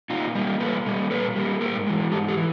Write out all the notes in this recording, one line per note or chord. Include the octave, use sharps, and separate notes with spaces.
A#2 D#4 F4
G3 A#3
A#2 A4 B4
G3 A#3
A#2 A4 B4
G3 A#3
G#2 G#4 A#4
E3 G#3
G#2 G4 A4
G4 A4
E3